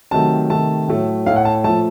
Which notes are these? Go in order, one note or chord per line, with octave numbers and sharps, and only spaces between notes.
C3 D#3 F#3 A3 A5
C3 D#3 A3 A5
A2 F#3 A3
A2 A3 F5
F#5
A5
A#2 F3 A3 A5